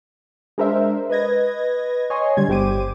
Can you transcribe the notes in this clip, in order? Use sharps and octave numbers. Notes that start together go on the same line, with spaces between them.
G#3 D4 A#4 C5 E5
B4 D#5 G#6 A#6
C#5 D#5 G#5 C6
D3 G3 G#6
G1 G4 C5 D6 D#7